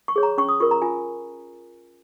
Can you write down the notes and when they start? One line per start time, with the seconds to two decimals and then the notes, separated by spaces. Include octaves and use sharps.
0.08 C#6
0.16 G#4 C#5
0.23 A#5
0.38 C#4 C#6
0.49 D#6
0.60 F4 A#4 C#6
0.71 A#5
0.82 F4 G#5